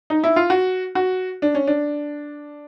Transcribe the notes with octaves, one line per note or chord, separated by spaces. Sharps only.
D#4
E4
F4
F#4
F#4
D4
C#4
D4